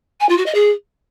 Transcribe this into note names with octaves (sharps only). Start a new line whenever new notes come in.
G#5
F4
F#4
D#5
G#4